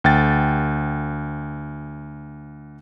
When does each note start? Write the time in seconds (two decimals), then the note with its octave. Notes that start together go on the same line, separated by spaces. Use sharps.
0.04 D2 G5 A6